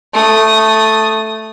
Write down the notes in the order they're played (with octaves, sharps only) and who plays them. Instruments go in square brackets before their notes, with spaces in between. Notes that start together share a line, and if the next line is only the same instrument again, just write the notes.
[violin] A3 D#6